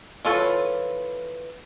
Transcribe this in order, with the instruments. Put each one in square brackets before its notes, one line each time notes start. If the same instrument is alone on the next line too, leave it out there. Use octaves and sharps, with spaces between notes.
[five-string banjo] E3 F4 A4 B4 C#5